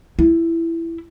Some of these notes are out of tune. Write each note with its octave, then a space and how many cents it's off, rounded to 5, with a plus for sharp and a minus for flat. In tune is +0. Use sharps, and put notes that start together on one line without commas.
E4 +10